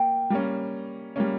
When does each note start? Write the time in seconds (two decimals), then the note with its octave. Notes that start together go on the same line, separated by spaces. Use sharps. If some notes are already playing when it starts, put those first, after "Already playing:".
Already playing: A#3 G5
0.30 G3 A#3 C#4
1.16 G3 A#3 C#4